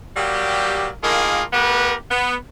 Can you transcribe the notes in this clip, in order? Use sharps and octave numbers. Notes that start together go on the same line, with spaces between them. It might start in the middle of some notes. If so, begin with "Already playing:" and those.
F#3 G3 A#3 G4
A2 D#3 A#3 F4 G#4
A3 B3 G4 A#4 B4
B3